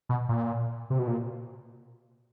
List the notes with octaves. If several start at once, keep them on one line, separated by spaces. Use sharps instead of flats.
B2
A#2
C3
B2
A#2